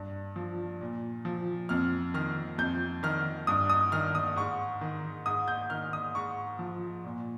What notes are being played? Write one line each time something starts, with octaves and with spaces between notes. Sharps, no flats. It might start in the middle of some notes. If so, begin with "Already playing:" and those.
Already playing: G2
F3
A#2
F3
F2 F6
D#3 F6
F2 G6
D#3 F6
G2 D#6
D#6
D#3 F6
D#6
G#2 C#6
D#3
G#2 D#6
G6
D#3 F6
D#6
G#2 C#6
F3
A#2